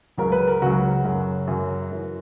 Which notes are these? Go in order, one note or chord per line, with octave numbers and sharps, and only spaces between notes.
C#2 C#3 F#3 A#4
B4
A#4
C#2 C#3 F#3 F#4
F#2 C#3 F#3
F#2 C#3 F#3
F#2 E3